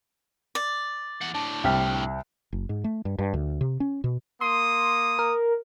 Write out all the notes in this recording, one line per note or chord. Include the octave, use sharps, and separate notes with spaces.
D5
E3 F#5
A2 D4 A5
C2 G5 F6 B6
F#1
G#2
A3
G2
G2
D2
C3
C#4
B2
A#3 C6 D#6
A#4